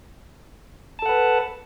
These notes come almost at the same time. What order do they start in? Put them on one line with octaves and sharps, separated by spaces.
A5 A4 F#5 B4